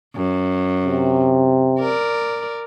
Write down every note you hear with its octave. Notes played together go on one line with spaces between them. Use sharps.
F#2
C3
A#4 D5